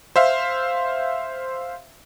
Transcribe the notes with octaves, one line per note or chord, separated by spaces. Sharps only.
C5 E5 F5